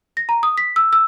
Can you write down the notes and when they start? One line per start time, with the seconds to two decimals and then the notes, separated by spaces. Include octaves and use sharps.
0.17 A#6
0.29 A#5
0.43 D#6
0.58 B6
0.76 E6
0.93 E6